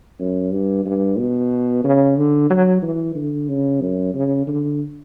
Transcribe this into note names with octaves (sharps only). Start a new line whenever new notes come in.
F#2
G2
G2
B2
C#3
D3
F#3
E3
D3
C#3
F#2
C#3
D3